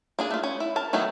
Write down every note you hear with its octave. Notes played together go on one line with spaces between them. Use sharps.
A#3 D4 G#4
A3 F4
C#4
E4
A#4 A5
D#3 F#3 A3 B3 D#4